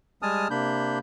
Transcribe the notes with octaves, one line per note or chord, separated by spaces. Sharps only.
G3 G#3 G#5 A5 D#6 F6
C3 A#3 D4 B5 G6